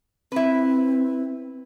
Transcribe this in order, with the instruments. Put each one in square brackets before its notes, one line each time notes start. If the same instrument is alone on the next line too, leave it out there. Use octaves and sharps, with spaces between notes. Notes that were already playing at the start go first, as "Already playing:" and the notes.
[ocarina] C4 [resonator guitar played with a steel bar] E4 B4